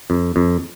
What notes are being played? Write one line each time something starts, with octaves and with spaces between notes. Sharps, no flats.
F2
F2